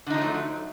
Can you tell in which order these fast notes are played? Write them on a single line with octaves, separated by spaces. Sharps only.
D3 D#4 F3 A3 F#3